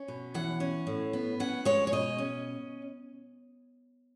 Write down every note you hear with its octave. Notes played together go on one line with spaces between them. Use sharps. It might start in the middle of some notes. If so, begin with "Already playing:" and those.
Already playing: C#4
B2
E3 F#5
C#4
A2
B3
C#4 F#5
G#3 C#5
C#5
B2 D#5
C#4